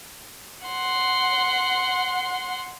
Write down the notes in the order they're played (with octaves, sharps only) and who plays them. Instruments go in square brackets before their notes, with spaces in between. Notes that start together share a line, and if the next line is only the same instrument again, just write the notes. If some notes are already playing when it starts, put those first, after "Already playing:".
[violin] F#5 C6